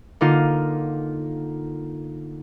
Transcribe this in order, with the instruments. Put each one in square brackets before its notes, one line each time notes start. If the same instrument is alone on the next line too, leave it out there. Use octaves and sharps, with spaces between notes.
[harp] D3 A#3 D#4 F4